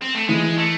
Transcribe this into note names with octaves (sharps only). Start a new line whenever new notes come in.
C4
A3
E3 G#3
A3